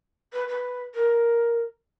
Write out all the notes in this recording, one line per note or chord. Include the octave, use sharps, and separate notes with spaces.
B4
B4
A#4